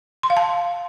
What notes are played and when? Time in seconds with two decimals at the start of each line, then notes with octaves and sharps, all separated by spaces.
0.23 C6
0.30 F5
0.37 A5